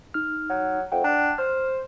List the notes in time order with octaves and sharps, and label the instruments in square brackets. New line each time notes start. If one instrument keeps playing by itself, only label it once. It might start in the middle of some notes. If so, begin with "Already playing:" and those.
[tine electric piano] D#4 F6
[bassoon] F#3
[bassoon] F2 [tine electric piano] F#5 G5
[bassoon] D4
[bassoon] C5 [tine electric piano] F6